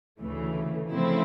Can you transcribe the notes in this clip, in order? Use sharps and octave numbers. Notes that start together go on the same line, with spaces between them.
D2 C#3 E3 A3
C#3 F3 A3 C4 E4